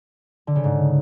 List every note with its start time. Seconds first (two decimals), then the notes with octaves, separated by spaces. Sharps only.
0.47 D3
0.56 C#3
0.64 G#2